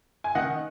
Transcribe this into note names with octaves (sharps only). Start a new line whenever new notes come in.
G#5
D#3 D#5 F#5